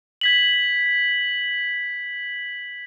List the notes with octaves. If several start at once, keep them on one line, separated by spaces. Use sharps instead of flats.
G#6 B6 F#7